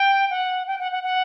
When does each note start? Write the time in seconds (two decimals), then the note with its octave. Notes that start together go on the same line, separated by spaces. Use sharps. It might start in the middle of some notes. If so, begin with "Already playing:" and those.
Already playing: G5
0.30 F#5
0.67 G5
0.79 F#5
0.92 F#5
1.03 F#5